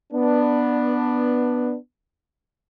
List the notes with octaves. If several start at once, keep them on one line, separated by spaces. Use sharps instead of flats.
B3 D4